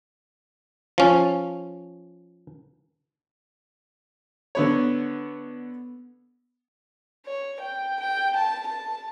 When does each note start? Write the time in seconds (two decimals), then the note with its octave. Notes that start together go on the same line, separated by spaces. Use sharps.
0.98 F3 C#4
4.55 D3 B3 C#5
7.26 C#5
7.60 G5
8.00 G5
8.36 A5
8.67 A5